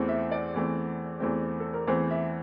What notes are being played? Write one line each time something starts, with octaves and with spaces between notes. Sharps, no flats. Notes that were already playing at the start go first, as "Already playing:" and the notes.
Already playing: E2 E3 A3 C4
E5
D5
E2 E3 A3 C4
E2 E3 A3 C4
A4
A#4
E2 E3 A3 C4 C5
E5